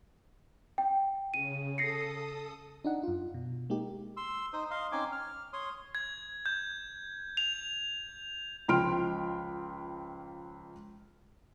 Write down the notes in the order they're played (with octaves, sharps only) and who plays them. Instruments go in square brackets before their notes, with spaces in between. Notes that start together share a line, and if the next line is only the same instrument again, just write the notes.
[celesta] G5
[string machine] C#3 [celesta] D#7
[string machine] A4 D#6 [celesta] A#6 C7 C#7
[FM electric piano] D4 D#4 F#5
F#2 F4
B2
G#3 A#3 D#4 G4
[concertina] C6 E6
D#4 C5 D#6
D#5 F5 C6
C4 C#4 D#4 G#5 D6
F6
C#5 C6 D#6
[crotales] G#6
G6
F7
[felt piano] C#2 F3 G5 C6 F6 D7